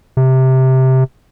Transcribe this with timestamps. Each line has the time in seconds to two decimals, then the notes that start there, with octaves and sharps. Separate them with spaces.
0.17 C3